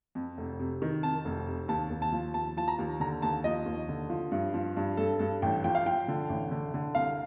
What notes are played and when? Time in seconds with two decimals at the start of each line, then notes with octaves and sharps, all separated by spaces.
0.15 F2
0.38 F1
0.60 C3
0.82 D#3
1.03 F2 A5
1.25 F1
1.48 C3
1.68 D#2 A5
1.90 D#2
2.02 A5
2.12 F3
2.34 D#2 A5
2.57 F3 A5
2.68 A#5
2.79 D#2
3.00 D3 A#5
3.22 D#2 A5
3.44 F3 D#5
3.66 D#2
3.89 D3
4.10 F3
4.32 G2
4.54 F3
4.77 G2
4.97 G2 A4
5.19 G2 A4
5.42 A1 G5
5.64 F3 G5
5.75 F5
5.86 F3 G5
6.08 D3
6.29 A1
6.51 D3
6.74 D3
6.95 C2 F5